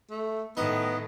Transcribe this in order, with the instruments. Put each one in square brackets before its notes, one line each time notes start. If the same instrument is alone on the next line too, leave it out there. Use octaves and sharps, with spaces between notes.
[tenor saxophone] A3
[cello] A2 D#3 [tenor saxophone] B3 [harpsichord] D#4